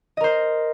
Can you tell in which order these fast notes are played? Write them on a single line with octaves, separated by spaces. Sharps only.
D#5 A#4 C5